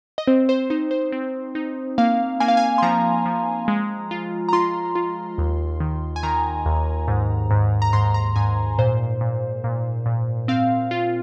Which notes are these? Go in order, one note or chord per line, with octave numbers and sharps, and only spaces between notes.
D#5
C4 C5
C5
D#4 C5
C5
C4
D#4
A#3 F5
A#3 G#5
F5
G#5
C6
F3 A#5
F3
G#3
F4
A#5
F4 C6
F4
D#2
D#3
G#5
D#3 A#5
D#2
G#2
G#2
A#5
G#2 C6
A#5
G#2 G#5
A#2 C5
A#2
A#2
A#2
C4 F5
F4